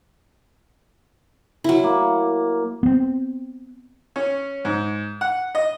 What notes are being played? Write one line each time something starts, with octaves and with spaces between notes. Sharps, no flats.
F#3 E4
A#3
B3 C4
C#4
G#2
F#5
D#5